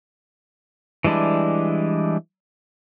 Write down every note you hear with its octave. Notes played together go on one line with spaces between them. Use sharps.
E3 G3 G#3 D4 E4